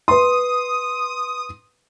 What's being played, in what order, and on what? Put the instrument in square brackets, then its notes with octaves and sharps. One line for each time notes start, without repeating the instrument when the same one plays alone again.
[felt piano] B4 C6 [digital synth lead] D#6